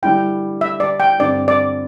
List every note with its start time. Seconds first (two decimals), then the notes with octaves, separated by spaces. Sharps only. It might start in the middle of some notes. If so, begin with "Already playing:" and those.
0.03 D3 G3 E4 G5
0.61 E5
0.80 D5
1.00 G5
1.19 G2 D3 C4 D5
1.48 D5